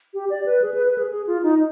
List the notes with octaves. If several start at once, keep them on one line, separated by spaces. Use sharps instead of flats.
G4
D5
B4
G#4
B4
B4
G#4
G#4
F4
D#4